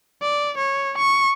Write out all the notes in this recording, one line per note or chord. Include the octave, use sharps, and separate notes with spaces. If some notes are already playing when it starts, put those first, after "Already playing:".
D5
C#5
C#6